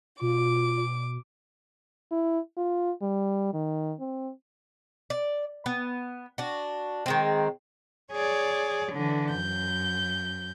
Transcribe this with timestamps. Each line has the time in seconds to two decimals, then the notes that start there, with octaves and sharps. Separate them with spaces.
0.21 B2 F4 D6
2.11 E4
2.57 F4
3.02 G3
3.53 D#3
4.00 C4
5.10 D5
5.66 B3
6.38 D4 F#4
7.06 D#3 G#3 C4
8.11 G#4 C#5 D5
8.93 D3 E3
9.30 F#2 G6